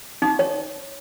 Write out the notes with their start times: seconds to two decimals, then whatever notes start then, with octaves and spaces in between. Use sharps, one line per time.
0.22 D#4
0.39 C#5